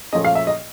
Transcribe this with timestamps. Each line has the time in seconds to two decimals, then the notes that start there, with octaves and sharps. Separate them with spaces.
0.13 A#2 F3 A3 C#4 D#5
0.25 F5
0.35 E5
0.47 D#5